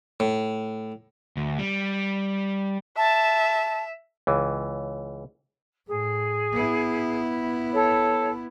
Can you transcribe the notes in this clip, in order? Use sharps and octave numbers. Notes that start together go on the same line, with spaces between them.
A2
D2
G3
E5 A5
C#2 E3
A2 G#4
B3 E4
A4 C#5